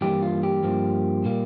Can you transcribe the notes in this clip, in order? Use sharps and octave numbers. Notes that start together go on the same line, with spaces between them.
G2 E3 G3 A#3 G4
F4
G4
G2 F3 A#3
A#2 G3 A#3